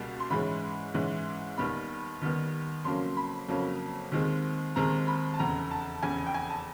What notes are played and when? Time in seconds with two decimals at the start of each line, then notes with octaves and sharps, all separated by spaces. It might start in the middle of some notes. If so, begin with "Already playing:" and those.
Already playing: C#2 B2 G3 A#3
0.20 C6
0.30 G#2 E3 G#3 C#4 B5
0.94 G#2 E3 G#3 C#4
1.58 D#2 D#3 G3 B3 B5
2.22 D#2 D#3 G3 B3
2.84 F2 C#3 F#3 A#3 C#4 C6
3.17 B5
3.48 F2 C#3 F#3 A#3 C#4
4.12 D#2 D#3 G#3 C4
4.76 D#2 D#3 G#3 C4 A#5
5.07 B5
5.34 A5
5.39 F1 E2 C#3 A#5
5.71 A5
6.02 F1 E2 C#3 G#5
6.26 G5
6.34 G#5
6.50 A5